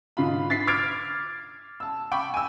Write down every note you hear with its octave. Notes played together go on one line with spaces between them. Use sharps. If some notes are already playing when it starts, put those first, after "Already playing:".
G#2 D3 F4 B5
A6 B6 C7
D6 F6 G#6 A6 C7 D7
A5 E6
G5 B5 C#6 D6
G#5 E6